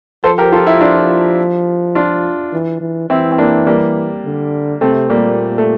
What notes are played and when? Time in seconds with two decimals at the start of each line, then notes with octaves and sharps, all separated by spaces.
0.24 F3 A4 C5
0.38 G4 A#4
0.52 F4 A4
0.66 E4 G4
0.81 D4 F4
1.95 D4 F4
2.52 E3
2.81 E3
3.10 E3 C4 E4
3.32 C4
3.38 A#3 D4
3.67 G3 A#3
4.25 D3
4.81 C3 A3 C4
5.09 A#2 G3 A#3
5.58 A3